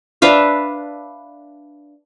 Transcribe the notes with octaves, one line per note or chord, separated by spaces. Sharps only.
D4 B4 E5 F5